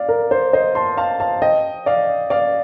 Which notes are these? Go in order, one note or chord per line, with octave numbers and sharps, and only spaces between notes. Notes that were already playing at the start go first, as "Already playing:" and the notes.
Already playing: D5 F5
A#4
C5
C5 D#5
A5 C6
F5 A5
F5 A5
D#5 G5
D5 F5
D5 F5